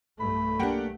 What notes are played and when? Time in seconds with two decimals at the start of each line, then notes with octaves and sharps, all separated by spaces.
0.20 B1 G2 A3 B5
0.60 A#3 D4 G4 F#5 G5